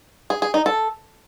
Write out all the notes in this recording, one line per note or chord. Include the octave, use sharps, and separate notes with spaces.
G#4
G#4
D#4
A4